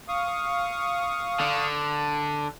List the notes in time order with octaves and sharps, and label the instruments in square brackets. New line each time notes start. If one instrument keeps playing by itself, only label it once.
[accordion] F5 C#6 D#6
[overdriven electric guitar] D3